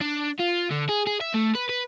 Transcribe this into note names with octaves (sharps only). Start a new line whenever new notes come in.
D4
F4
D3
G#4
G#4
E5
A3
B4
B4